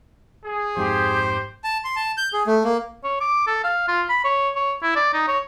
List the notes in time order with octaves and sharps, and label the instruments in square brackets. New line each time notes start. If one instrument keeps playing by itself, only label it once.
[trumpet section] G#4
[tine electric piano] F2 G#2 [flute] G4 [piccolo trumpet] C5
[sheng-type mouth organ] A5
C6
A5
G6
G#4
A3
A#3
[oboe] C#5
D6
A4
F5
F4
B5
C#5
C#5
E4
D5
D#4
C#5